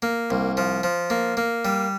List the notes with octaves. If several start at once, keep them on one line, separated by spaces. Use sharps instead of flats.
A#3
C2
F3
F3
A#3
A#3
G3